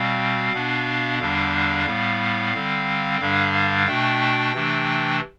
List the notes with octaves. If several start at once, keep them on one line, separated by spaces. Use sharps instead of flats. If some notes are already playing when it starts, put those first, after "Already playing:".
Already playing: B2 G3 C4 F5
B2 B3 D4
E2 D3 G3 D4 F5
A2 G3 B3
D3 G3 C4
G2 D3 G3 D4 F5
F5
B2 A3 D4 G5
C3 E3 A3 D4